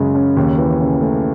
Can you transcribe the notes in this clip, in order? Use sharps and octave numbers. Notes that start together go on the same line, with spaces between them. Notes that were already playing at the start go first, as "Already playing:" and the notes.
Already playing: F#2 C#3 G#3
C#4
D#2
E3
C#3
A3